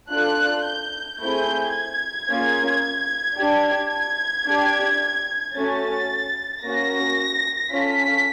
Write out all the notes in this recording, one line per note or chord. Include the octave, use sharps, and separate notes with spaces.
D4 F4 A4 F#6
G6
A3 C4 E4 G#4 G6
G#6
A#3 C#4 F4 G#4
D4 G4
G#6
D4 G4
A3 C#4 F#4 A6
A#3 C#4 F#4 A#6
C#4 F4 A4 B6